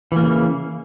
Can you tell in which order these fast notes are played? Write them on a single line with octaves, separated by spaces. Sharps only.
E3 A#3 C#3